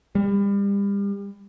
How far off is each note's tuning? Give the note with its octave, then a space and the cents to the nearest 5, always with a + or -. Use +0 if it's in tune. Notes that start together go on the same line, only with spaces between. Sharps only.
G3 +35